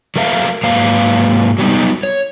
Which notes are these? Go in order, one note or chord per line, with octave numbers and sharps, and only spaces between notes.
F#3 A3 A#4 E5 F5
G#2 F#3 A#3 B4 F5
F#3 G3 B3 D#4
C#5